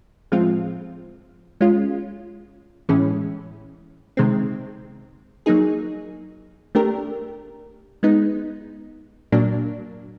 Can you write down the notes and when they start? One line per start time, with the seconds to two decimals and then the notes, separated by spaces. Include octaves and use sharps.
0.32 A2 F3 G#3 C4 F4
1.61 G#3 C#4 F4
2.89 A2 E3 G#3 C#4
4.17 C3 D#3 G#3 C4
5.46 F#3 A#3 D#4 G#4
6.75 A3 D4 G4 A#4
8.03 G#3 B3 D#4
9.32 A#2 F#3 A#3 D4